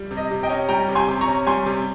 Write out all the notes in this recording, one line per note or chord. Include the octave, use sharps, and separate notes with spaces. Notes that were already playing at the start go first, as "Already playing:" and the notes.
Already playing: G3
C3
D#5
C3
D#5 G5
C#4
G3 G5 A#5
C3
G#5 C6
C3
A#5 C#6
C#4
G3 G#5 C6
C3